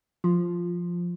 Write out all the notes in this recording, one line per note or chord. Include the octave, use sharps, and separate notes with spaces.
F3